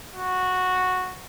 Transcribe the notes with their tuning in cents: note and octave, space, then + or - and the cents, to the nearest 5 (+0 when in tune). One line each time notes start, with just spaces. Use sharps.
F#4 -10